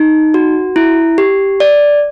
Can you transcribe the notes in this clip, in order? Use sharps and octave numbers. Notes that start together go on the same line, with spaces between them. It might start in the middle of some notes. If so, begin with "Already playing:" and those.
Already playing: D#4
F#4
E4
G4
D5